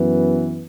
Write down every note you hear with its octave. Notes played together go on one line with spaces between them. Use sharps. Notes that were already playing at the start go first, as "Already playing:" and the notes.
Already playing: F#2 E3 B3